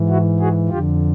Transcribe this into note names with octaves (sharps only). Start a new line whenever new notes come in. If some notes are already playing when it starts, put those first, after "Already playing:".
Already playing: G#2 E3
E4 F#4
F#4 G#4
F2 D3 F4 G4